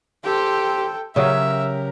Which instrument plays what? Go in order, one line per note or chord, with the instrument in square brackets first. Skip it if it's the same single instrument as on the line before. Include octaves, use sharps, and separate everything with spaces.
[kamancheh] G4 C5 [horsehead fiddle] A4 G5
[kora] C#3 F#3 [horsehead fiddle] G4 A#4 [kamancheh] E5